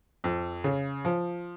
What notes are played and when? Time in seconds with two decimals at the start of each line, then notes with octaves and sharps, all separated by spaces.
0.24 F2
0.64 C#3
1.05 F3